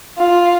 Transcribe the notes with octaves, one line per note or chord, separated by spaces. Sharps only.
F4